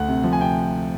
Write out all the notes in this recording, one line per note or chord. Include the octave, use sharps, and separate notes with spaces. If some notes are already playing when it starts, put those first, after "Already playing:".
Already playing: D2 F#5
C3
F3
G#5
C3 G5